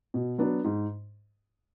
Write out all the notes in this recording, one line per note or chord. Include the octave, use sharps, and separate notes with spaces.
B2
F#3 B3 D4
G#2